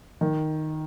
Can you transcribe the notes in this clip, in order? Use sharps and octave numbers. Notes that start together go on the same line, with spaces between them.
D#3